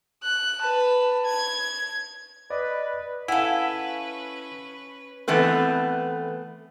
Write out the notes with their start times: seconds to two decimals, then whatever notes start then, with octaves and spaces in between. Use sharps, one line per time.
0.24 F#6
0.62 B4 A5
1.26 G#6
2.50 B4 D5 D#5
3.28 C#4 E4 A4 B4 F5 F#5 G#5
5.28 E3 A3 B3 C4 B4